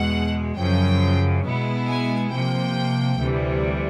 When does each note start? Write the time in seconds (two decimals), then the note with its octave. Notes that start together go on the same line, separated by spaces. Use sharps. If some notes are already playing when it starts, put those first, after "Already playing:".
Already playing: E2 B2 G#3 F#5
0.56 F#2 C#3 F3 G5
1.44 B2 G#3 B3 E4
1.88 G#5
2.31 C3 F3 A#3 G5
3.19 D2 C3 E3 G3